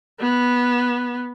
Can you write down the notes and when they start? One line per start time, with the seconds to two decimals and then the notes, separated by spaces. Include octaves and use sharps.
0.20 B3